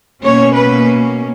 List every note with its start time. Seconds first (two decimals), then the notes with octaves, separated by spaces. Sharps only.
0.23 B2 A#3 C#4 C#5
0.55 B4